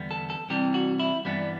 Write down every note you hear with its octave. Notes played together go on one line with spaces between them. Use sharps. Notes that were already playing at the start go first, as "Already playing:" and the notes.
Already playing: E2 D3 G3 B3
A4
A4
C2 C3 E3 G3 G4
F#4
E4
G2 E3 G3 B3 D4